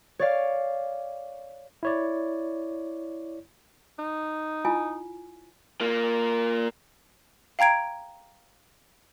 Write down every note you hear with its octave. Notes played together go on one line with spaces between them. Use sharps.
C#5 D5 F5
E4 C#5 D5
D#4
E4 F4 G#5
A#3 F4
F5 G5 A#5 G#6 D7